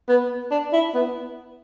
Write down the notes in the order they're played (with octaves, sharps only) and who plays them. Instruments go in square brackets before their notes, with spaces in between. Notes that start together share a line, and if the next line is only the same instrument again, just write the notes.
[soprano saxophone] B3
D4
E4
B3